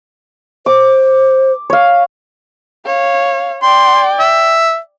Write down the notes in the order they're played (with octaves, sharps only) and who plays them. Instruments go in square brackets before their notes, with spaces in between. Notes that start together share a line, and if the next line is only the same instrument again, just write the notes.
[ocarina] C5 [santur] D6
[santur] C#5 F5
[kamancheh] C#5 F5
[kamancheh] D5 G5 [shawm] C6
[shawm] E5